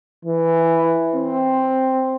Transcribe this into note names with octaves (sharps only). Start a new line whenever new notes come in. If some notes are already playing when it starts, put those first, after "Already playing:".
E3
C4